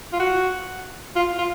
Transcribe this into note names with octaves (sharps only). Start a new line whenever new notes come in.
F4
F#4
F4
F4